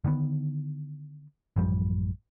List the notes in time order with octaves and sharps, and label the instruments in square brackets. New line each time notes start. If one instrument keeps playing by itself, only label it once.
[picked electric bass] D3 D#3 G3 B3
A1 F#2 F3 G3